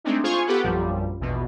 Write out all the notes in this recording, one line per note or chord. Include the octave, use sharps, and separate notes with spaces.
G#3 A3 C4 D4 D#4
F4 G#4 C5 F5 G#5 C#6
B3 G4 A4 B4 F#5
A#1 F#2 A#2 F3 G3
A#1 E2 B2